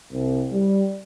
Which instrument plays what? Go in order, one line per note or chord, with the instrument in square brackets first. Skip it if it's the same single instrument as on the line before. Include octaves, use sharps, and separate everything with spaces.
[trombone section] C2
G3